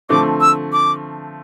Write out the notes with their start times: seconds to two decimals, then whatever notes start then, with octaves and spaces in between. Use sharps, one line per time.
0.09 D3 F3 A3 C4 D6
0.41 E6
0.73 D6